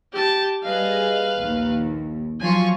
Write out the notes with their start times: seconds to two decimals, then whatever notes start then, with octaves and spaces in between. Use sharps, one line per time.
0.13 G4 A5
0.64 G3 G#4 B4 D#5 F5
1.38 A#1 D#2
2.41 F3 F#3 F4 G#5 C#6